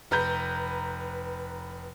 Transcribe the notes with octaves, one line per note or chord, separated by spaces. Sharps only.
F1 B4 A#5 G6